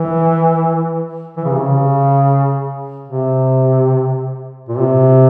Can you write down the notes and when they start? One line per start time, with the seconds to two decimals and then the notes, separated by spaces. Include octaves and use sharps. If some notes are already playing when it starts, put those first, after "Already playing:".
Already playing: E3
1.37 E3
1.45 C#3
1.52 C3
1.59 C#3
3.08 C3
4.69 A#2
4.79 C3